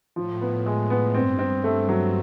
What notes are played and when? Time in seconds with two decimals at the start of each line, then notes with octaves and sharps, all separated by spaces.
0.16 A2 F3
0.41 B3
0.66 G#3
0.90 B3
1.14 G2 C4
1.39 C4
1.64 A3
1.89 F#3